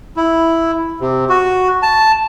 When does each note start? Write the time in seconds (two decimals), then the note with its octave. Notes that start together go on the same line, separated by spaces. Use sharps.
0.17 E4
1.00 C3
1.30 F#4
1.82 A5